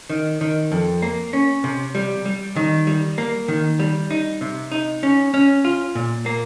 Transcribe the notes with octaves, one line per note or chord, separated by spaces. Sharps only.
D#3
D#3
F2
A#3
C#4
C3
G3
G3
D#3
G3
A#3
D#3
G3
D#4
C3
D#4
C#4
C#4
F4
A#2
A#3